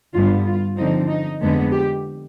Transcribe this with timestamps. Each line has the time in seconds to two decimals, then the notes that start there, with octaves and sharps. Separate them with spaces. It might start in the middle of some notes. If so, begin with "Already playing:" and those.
0.14 G2 D3 G3 B3 F4
0.46 F4
0.77 D3 F3 C4 D#4
1.08 D#4
1.40 F2 D3 G#3 B3
1.72 G4